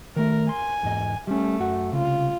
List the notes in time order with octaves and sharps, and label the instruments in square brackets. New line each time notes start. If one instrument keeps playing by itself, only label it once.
[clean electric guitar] D#3 A3 [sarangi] A#4
[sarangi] G#5 [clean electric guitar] C6
[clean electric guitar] E2 G#2 D#5
[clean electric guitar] G3 C#4 [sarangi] A3
[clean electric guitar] F#2 F#4 F#5
[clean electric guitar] C2 C#3 [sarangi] F4